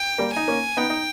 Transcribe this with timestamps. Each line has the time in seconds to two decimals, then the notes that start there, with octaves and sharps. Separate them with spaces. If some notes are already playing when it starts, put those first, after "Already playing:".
Already playing: G5
0.18 G3 A#3
0.33 D#4 G#5
0.48 A#3 C#4
0.77 B3 D#4 G5
0.90 D#4